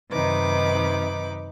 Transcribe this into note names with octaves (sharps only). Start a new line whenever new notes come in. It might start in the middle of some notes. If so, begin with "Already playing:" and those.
F#2 C3 D#3 D#4 B4 D6